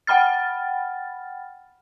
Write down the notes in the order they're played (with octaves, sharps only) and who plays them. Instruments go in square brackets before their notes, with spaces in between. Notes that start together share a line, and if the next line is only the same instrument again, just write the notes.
[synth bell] F#5 G5 B5 F6 A6